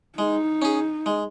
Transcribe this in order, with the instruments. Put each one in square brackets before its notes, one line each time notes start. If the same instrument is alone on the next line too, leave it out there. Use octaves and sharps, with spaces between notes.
[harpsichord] G#3 [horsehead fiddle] D#4
[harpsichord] C#4 G#4
G#3